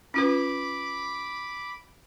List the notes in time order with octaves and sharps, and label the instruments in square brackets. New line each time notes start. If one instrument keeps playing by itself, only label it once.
[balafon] C#4 F4 B4 [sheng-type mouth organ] B5 D6